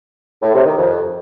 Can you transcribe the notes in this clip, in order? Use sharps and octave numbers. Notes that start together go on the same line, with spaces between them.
A2
C3
D#3
F2